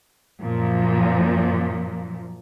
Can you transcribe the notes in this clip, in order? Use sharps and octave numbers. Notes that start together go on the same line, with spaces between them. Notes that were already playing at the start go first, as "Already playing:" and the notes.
F#2 A#2 F3